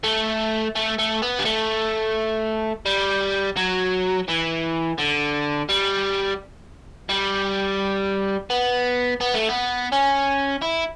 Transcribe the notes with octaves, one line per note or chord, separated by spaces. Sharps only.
A3
A3
A3
B3
G3
A3
G3
F#3
E3
D3
G3
G3
B3
B3
A3
B3
C#4
E4